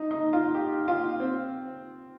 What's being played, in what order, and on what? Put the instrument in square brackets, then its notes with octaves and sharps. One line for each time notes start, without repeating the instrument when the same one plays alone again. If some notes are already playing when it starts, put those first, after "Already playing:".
Already playing: [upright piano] D#4
D#4
F4
G4
F4
C4